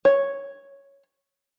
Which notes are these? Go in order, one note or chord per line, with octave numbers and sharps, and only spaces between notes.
C#5